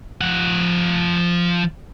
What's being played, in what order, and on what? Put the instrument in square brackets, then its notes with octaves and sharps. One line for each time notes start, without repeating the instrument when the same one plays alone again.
[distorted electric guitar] F3 F#5